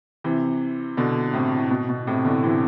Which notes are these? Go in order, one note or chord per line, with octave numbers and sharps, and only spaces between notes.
C3 E3
B2 D3
A2 C3
B2
B2
A2 C3
B2 D3
C3 E3